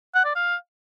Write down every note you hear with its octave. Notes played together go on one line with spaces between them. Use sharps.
F#5
D5
F5